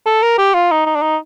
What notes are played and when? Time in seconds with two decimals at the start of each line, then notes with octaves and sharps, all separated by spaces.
0.06 A4
0.23 A#4
0.38 G4
0.54 F4
0.71 D#4
0.86 D#4
0.96 D4
1.02 D#4